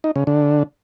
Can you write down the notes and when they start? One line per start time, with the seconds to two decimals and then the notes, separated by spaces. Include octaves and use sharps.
0.04 D#4
0.16 C#3
0.27 D3